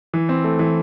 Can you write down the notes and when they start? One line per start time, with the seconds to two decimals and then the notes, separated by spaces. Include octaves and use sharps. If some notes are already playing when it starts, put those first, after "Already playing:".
0.14 E3
0.29 C4
0.44 A3
0.59 E3